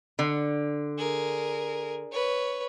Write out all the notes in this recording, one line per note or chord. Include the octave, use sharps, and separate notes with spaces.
D3
G#4 A#4
B4 C#5